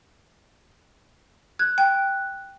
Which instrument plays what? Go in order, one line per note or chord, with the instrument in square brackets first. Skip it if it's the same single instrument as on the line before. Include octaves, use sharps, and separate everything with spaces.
[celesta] F#6 [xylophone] G#6
[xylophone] G5